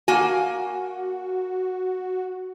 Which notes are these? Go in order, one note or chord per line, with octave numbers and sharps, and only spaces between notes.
A#3 F#4 G#5